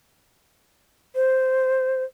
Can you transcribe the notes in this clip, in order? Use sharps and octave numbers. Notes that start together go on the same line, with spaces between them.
C5